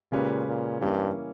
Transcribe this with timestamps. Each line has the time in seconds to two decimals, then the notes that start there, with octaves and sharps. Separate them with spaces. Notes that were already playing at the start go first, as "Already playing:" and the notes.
0.12 A#2 C#3 G#3 C#4 G4 B4
0.47 A#2
0.81 G2 E3 G3 A#3 C#4 E4